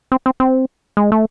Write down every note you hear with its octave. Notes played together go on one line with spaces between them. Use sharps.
C4
C4
C4
G#3
A3